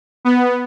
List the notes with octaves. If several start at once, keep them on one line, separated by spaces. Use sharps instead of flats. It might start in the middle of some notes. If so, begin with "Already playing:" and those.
B3